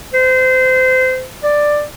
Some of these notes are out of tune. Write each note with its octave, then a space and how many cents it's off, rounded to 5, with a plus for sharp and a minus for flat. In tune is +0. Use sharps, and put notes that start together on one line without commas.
C5 -25
D5 +10